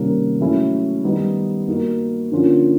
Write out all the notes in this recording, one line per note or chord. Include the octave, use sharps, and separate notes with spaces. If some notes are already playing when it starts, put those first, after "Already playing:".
Already playing: C3 D#3 G3 A#3 C#4
F#3 A3 C#4 E4
D#3 G3 B3 D#4
A#3 D#4 F#4
D3 F3 A#3 C#4 F4